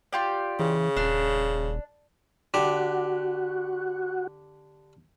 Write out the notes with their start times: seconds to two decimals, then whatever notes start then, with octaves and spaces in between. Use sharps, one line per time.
0.12 F4 G4 D5
0.59 C#3 E3
0.97 D#1 D4
2.54 D3 F#4 G4